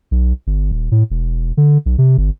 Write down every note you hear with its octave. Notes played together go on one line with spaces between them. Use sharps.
B1
G1
D#1
A2
E1
D3
B1
C3
G1